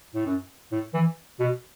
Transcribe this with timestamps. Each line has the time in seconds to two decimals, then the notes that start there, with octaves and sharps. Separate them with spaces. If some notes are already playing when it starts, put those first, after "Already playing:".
0.14 A2
0.26 F#2
0.72 A2
0.94 E3
1.40 B2